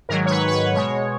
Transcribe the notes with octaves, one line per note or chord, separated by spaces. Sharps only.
G#2 D#3 F#3 A#4
C#5
B4
B4
C#5
B2 G#3 C#5